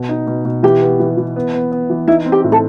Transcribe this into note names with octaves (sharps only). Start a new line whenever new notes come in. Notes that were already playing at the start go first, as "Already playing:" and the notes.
Already playing: B2
D#4
B2
B2
E3 G4
B3
E3
E3
B3
B3
B3
E3
D#4 E4
C4
G4
A2
A4